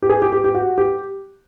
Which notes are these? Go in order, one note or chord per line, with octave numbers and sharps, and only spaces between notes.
G4
G#4
G4
G4
G4
F#4
G4